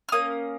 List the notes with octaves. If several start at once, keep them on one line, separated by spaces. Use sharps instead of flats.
F6
A#3 C#4 D#6